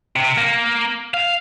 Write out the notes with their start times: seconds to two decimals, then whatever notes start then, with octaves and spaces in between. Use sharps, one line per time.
0.16 C3
0.38 A#3
1.14 F5